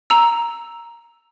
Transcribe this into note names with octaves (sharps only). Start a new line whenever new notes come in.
A#5 E6